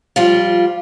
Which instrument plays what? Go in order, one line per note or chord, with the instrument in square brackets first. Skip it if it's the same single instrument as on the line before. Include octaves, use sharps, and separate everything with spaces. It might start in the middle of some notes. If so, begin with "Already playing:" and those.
[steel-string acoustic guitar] F3 G3 F4